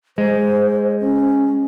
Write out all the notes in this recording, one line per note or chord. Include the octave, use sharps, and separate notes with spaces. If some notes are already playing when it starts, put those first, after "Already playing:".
G#3 C5
C#4